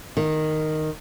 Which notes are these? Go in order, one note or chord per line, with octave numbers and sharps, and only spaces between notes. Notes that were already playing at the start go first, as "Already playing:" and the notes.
D#3